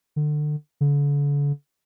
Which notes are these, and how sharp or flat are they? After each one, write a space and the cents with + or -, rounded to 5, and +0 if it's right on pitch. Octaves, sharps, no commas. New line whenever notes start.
D3 +30
D3 -40